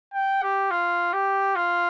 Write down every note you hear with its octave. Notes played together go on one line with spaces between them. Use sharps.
G5
G4
F4
G4
F4